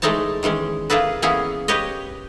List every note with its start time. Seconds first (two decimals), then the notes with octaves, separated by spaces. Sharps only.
0.02 E3 G#3 A3 D#4 C#5 A5
0.43 D#3 E3 G#3 C#4
0.90 A#3 E4 G#4 A4 B4
1.22 E3 A#3 B3 C#4 E4 G#4
1.68 G4 B4 C#5 D#5